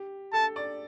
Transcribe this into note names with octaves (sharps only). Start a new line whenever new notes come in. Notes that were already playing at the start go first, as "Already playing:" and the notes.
Already playing: G4
A4 A5
D5